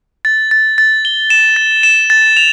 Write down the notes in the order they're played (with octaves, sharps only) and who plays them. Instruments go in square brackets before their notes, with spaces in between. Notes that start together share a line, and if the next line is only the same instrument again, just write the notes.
[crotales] A6
A6
A6
G7
E7
A6
E7
A6
F7